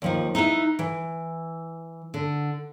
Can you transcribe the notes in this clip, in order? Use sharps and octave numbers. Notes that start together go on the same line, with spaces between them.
D#2 F3 D#4
D#4 E4 B4 E5
E3
D3